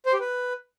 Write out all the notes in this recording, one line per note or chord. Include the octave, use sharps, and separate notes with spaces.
C5
G4
B4